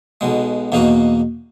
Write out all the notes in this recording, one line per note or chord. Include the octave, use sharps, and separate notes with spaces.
B1 B2 G#3
E2 B2 A#3 D#4 F#4